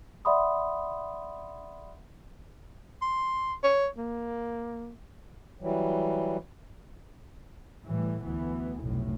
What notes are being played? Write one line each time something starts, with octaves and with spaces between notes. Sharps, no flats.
D5 E5 F#5 B5 C6 D#6
C6
C#5
A#3
E3 F#3 G3
A2 E3 G3
D2 E3 B3
F1 B1 A2